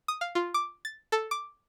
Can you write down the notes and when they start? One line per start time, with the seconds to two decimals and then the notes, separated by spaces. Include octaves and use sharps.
0.08 D#6
0.21 F5
0.35 F4
0.54 D6
0.85 A6
1.12 A4
1.31 D6